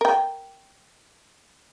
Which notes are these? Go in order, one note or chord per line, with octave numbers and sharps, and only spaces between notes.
A#4 G5